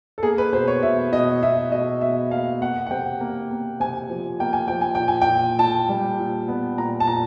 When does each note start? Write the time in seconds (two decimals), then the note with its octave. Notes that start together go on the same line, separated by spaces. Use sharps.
0.18 A4
0.23 A#3 G#4
0.38 B4
0.53 B2 C5
0.68 C#5
0.83 B2 E5
1.12 B2 D#5
1.42 B2 E5
1.72 B2 D#5
2.01 B2 E5
2.31 A#3 F5
2.61 A#3 F#5
2.87 F#5
2.91 C3 G5
3.20 A#3
3.51 A#3
3.80 C3 G#5
4.10 F3
4.40 A#3 G5
4.53 G#5
4.68 F3 G5
4.81 G#5
4.95 A#2 G5
5.08 G#5
5.22 G5
5.29 A#2
5.59 A#2 A5
5.89 G3
6.19 A#2
6.48 B3
6.78 A#2 A#5
7.00 A5
7.07 A#2 A#5